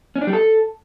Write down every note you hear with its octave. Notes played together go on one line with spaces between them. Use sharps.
C#4
D4
G3
A4